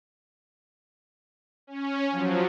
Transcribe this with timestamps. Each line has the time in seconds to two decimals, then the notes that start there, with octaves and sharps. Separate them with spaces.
1.67 C#4
2.11 F3 F#3